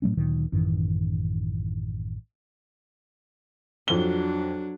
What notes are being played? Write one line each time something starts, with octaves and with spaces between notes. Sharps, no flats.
A2 F#3 A3 C#4
D2 A#2 D#3 F#3
A1 F#2 D#3 E3
F2 F#3 D4 G7